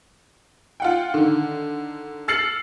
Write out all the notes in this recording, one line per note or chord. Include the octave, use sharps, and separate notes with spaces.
F4 F#5 G5
D3 D#3
E6 F6 A6 C7 C#7 F#7